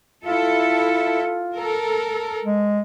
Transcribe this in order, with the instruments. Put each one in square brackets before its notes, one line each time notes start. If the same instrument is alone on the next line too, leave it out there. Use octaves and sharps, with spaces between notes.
[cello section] E4 A4 [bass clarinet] F4
[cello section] A4 A#4
[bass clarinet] G#3